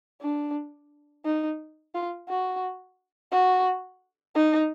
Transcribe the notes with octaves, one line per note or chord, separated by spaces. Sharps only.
D4
D#4
F4
F#4
F#4
D#4